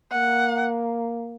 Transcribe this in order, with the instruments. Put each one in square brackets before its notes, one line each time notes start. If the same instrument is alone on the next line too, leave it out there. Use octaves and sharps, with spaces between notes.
[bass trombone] A#3 [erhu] F#5